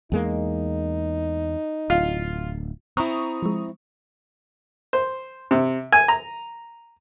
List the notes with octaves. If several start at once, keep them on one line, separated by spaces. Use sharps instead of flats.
E2 G#3 A#3 D#4
D1 F4
C4 E4 A#5 C#6 D#6
F3 G#3
C5
C3
G#5
A#5